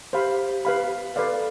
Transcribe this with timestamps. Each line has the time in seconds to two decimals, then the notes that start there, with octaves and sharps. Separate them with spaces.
0.13 G4 C5 F5 B5
0.65 B4 F5 B5
1.16 A4 B4 D5 F5